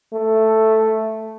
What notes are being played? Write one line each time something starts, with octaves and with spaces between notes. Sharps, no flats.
A3